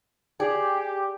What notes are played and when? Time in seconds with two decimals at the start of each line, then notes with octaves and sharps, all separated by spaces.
0.40 G4 G#4 D5